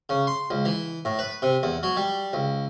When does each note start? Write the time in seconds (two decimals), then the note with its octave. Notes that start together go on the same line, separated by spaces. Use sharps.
0.09 C#3
0.27 C6
0.50 C#2
0.65 E3
1.05 A2
1.19 B4
1.42 C3
1.63 E2
1.83 F#3
1.97 G3
2.33 C#2